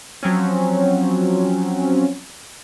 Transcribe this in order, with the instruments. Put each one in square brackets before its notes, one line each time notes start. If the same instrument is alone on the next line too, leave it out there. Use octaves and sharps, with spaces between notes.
[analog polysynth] F3 F#3 C4 C#4